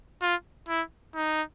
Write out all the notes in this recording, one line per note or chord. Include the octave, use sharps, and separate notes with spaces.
F4
E4
D#4